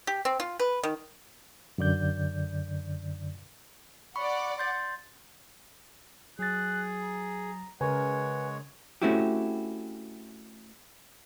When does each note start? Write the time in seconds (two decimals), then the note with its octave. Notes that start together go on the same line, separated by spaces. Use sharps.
0.07 G4
0.25 C4
0.40 F4
0.59 B4
0.83 D#3
1.78 F#2 D3 D5 G6
4.16 D5 F#5 B5 C#6
4.58 C6 G6 A6
6.39 F#3 G#4 F#6 A6
7.03 A#5
7.81 C#3 G#3 A#4 B4 C#5 F#5 G#5
9.02 A3 C4 C#4 E4 F#4 G4